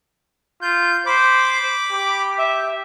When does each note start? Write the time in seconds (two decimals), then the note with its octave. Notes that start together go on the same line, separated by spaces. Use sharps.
0.62 F4 G6
1.06 C5 B5 D6
1.92 G4
2.39 E5